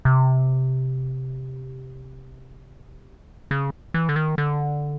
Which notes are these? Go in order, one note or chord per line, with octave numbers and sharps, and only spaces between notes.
C3
C#3
E3
D3
D#3
D3